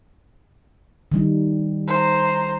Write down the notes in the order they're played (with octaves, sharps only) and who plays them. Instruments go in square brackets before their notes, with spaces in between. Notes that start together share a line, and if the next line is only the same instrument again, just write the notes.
[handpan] D#3 G3 D#4
[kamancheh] C5 A#5